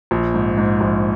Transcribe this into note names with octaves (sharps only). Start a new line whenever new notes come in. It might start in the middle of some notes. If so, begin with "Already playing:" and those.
A#1
G#2
G#2
A#1